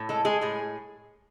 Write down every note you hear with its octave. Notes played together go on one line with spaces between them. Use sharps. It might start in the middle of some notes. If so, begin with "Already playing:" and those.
Already playing: A2
G#3 A4
G#3 G#4
A2 G#4